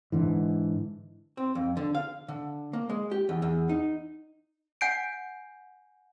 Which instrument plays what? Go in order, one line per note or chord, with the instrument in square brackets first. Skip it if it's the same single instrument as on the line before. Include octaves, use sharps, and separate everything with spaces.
[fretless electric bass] G#2 D3 E3
[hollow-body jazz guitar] C4
F2
D3
F5
D3
A#3
G#3
G4
E2
E2
D#4
[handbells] F#5 G#5 G6 C7 D7